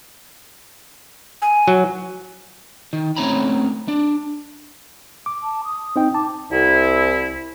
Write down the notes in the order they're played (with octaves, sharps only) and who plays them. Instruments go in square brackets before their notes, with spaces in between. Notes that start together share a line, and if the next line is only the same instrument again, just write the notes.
[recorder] G#5
[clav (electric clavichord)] F#3
[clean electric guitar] D#3
A3 C4 C#4 C#5 A#5 B5
D4
[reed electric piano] D6
[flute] A5
D#6
[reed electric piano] C4 D#4 G5
[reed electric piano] A5 [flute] D6
[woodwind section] C2 E4